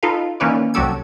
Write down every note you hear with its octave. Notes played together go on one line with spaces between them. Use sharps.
D#4 F4 A4 B4 F5
D#3 E3 A#3 C#4 B4 D5
C2 F#3 F#4 G4 A4 G#6